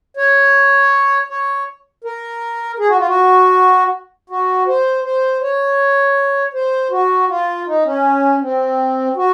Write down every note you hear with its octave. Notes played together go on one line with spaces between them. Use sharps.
C#5
C#5
A#4
G#4
F#4
F4
F#4
F#4
C5
C5
C#5
C5
F#4
F4
D#4
C#4
C4
F#4